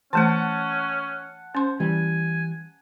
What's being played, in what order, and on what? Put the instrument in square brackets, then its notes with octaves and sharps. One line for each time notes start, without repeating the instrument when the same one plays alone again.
[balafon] E3 A3 [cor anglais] C#4 [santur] F#5 A5
[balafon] C#4 C6 [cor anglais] C5
[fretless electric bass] E3 G3 [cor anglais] G#5